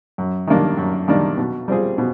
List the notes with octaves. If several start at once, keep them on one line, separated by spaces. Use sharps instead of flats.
F#2
D#3 G3 A#3 D4
F#2
D#3 G3 A#3 D4
B2
G3 C4 F4 G#4
B2